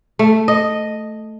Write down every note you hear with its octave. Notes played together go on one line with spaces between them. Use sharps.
A3
D#5